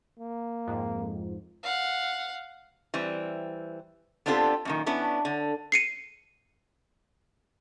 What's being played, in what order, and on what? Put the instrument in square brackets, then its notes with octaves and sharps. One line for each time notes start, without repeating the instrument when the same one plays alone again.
[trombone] A#3
[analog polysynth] F2 G#2
[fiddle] F5 F#5
[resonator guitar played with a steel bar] E3 G3 C4
B3 C4 D4 F4 G4 A4
F#2 A#2 D#3
B3 C#4 D4 E4
D3
[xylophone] C7 C#7 D#7